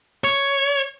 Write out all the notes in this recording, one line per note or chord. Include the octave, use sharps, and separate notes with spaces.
C#5